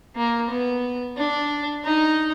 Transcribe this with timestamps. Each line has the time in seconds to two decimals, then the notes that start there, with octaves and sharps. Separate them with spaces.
0.16 A#3
0.50 B3
1.17 D4
1.85 D#4